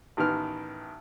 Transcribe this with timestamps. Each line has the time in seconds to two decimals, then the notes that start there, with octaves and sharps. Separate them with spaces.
0.17 A1 D#3 B3 F6